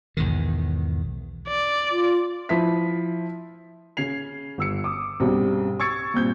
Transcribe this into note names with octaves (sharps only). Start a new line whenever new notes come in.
B1 E2 G#2 D#3
D5
F4
F3 E4 B6
C#3 C#4 G#6 C7 F7
G1 E6 C#7
D6 D#6
B1 G2 C#3 G3 C4
C#6 E6 G#6 A6 C#7
G2 A#2 C4 G6